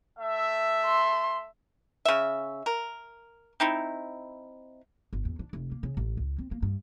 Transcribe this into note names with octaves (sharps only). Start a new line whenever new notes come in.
A3 E5
C6
C#3 E5
A#4
C4 D#4 E4
G1
E2
D4
F1
A#3
C#3
A1
C#2
C4
A#3
G2